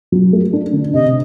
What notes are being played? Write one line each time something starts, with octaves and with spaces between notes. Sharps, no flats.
F#3
A3
D4
D3
C3 D#5